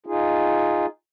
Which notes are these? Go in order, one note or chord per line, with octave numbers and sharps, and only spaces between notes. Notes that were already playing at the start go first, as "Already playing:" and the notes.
D#4 F4 G#4